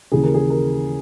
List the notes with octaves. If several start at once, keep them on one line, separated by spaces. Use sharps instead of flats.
D#2 C#3 E3 G#4
A#4
G#4
A#4